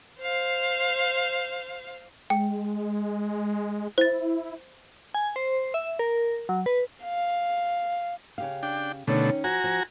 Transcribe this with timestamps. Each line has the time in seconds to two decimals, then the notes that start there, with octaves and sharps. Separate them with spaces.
0.20 C5 F5
2.30 G#3 G5
3.98 E4 C5 A6
5.14 G#5
5.36 C5
5.74 E5
5.99 A#4
6.49 F#3
6.66 B4
7.04 F5
8.38 C#3 G4 F5
8.63 D4 G5
9.07 B2 D3 D#3 A3 C#4
9.44 F3 F#4 G#5 A#5
9.64 F3